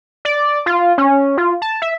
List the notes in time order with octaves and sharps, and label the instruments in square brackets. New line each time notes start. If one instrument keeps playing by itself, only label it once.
[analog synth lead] D5
F4
C#4
F4
A5
E5